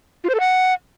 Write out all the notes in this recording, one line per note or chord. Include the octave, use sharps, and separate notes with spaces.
F4
C5
A4
F#5